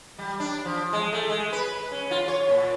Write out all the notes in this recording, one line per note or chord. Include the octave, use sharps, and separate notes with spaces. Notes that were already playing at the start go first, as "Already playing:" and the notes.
G3
D4
F3
G#3
A3
G#3
B4
C#4
F4
C#5
A#2